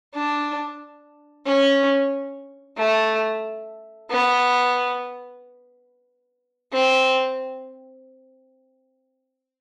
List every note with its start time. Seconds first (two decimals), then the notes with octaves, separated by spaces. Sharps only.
0.14 D4
1.46 C#4
2.77 A3
4.09 B3
6.73 C4